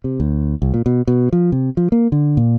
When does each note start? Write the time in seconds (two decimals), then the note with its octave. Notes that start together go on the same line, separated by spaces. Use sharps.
0.04 C3
0.20 D2
0.62 C2
0.74 A#2
0.86 B2
1.08 B2
1.33 F3
1.52 C3
1.77 F3
1.92 A#3
2.12 D3
2.37 A#2